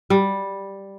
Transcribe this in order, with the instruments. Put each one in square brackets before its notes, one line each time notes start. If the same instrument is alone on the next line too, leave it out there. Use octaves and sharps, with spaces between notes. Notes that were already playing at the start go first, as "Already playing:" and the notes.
[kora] G3